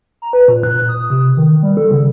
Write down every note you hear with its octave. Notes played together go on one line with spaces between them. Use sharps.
A#5
B4
A#2
F#6
D#6
C3
D#3
G3
A4
C#3